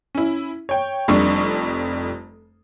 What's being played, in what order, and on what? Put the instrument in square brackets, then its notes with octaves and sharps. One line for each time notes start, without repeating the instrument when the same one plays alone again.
[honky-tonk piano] C#4 E4
C#5 G5
F1 F2 G3 D4 C#6